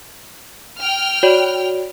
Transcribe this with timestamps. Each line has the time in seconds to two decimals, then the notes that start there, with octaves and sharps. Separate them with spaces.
0.80 G5 F6
1.23 F#4 C#5 D5